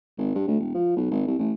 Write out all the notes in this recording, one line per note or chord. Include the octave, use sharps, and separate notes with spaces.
G#1
G2
D2
E1
F3
B1
G#1
C2
A1